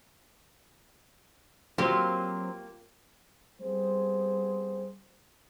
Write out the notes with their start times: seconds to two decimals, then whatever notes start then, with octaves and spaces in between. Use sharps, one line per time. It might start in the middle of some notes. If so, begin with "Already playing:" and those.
1.78 F#3 A#3 C4 F4 G4 C5
3.60 G3 B3 C4 G#4 C5